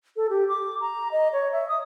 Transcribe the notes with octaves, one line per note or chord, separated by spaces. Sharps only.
A4
G4
D6
A#5
D#5
C#5
E5
D#6